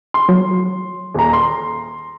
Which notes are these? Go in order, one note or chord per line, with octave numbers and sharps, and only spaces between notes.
C6
F#3
D#1 A#5
C6